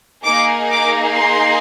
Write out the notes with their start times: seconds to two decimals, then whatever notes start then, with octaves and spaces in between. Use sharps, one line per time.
0.23 A#3 D#4 G#4 D6
0.70 D6
1.16 C6